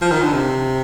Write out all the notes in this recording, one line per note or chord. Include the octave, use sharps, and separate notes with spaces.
F3
D#3
D3
C3